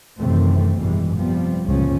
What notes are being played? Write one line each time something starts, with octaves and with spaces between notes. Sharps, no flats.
F#2 C3 D#3 E3 A3 C4
G#1 F#2 B2 E3 G3 G#3
C3 F3 G3 B3
G1 C#2 A#2 F3 C#4